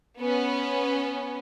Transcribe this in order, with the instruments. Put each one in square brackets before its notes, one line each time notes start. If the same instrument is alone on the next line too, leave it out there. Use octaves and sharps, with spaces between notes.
[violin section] B3 C#4